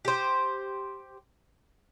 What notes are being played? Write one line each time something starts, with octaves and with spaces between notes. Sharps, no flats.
G4 C5